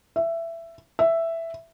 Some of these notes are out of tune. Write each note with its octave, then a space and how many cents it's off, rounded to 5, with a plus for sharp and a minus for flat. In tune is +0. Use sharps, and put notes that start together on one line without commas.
E5 +15
E5 +5